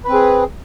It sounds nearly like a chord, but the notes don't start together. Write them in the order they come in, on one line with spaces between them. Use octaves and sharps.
B4 C4 G#4